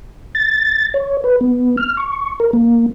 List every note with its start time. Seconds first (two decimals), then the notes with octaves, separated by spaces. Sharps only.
0.35 A6
0.94 C#5
1.24 B4
1.41 B3
1.77 F6
1.97 C#6
2.40 A#4
2.53 A#3